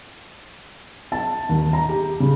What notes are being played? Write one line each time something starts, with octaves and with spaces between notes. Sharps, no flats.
A5
D#2
A#5
G4
C#3